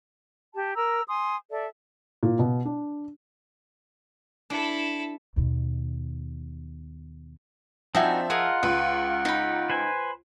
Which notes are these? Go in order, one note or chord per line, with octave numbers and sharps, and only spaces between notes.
G4 A5
A#4 A#5 E6
G#5 C6 D#6
A4 D5 E5
A#2
B2
D4
D4 E4 A4
D#2 B2
F3 C4 D4 D#4 F#4 E5 G#5
F4 G#4 A#4 D#5 F#5
C#2 B4
D#4 B5
B4 C5 G#5